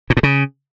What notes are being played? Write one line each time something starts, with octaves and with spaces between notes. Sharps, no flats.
A#2
A2
C#3